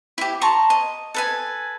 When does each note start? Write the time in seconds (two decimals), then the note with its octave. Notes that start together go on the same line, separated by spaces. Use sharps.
0.18 E4 G4
0.41 A5 A#5 C6 C#6
0.70 D#5
1.14 A4 B4 G#5